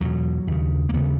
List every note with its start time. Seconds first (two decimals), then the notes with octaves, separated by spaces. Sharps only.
0.01 E2 B2 F#3
0.47 D#2 C#3
0.89 A#3
0.93 D#2 C#3 B3